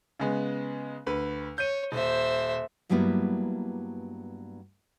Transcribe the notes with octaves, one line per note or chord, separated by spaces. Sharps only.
C#3 G#3 B3
D2 B4
C#5 G6 D#7
D#1 C5 E5
G2 F#3 G3 A#3 B3 E4